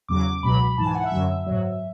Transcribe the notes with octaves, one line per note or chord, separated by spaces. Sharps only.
E2 C#3 F#3 D6
C#2 B2 F#3 B5
G#2 E3 A5
G#5
F#5
E5
F#2 D3 F#3
G#2 F#3